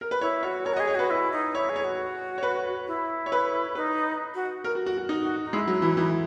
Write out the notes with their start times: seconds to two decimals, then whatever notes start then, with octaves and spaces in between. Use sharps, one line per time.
0.01 A#4
0.11 B4
0.21 E4 C#5
0.43 F#4 C#5
0.66 A#4 C#5
0.74 F#4
0.76 D#5
0.80 G#4
0.87 C#5
0.95 F#4 B4
1.10 E4
1.32 D#4
1.55 E4 C#5
1.69 G#4
1.76 C#5
1.84 F#4
2.38 C#5
2.43 B4
2.87 E4
3.26 C#5
3.32 B4
3.75 D#4 B4
4.35 F#4
4.64 A#4
4.75 F#4
4.86 F#4
4.97 F#4
5.09 D#4
5.23 F#4
5.45 D#4
5.53 G#3 E4
5.68 F#3
5.82 E3
5.97 E3 D#4